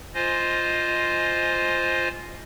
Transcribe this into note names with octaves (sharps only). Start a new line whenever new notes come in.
F4 C5 D#5 G#5